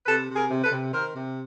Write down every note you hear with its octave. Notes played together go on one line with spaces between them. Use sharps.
C3 A4 B4
C3
G#4 A#4
C3
A4 B4
C3
D#3 A#4 C5
C3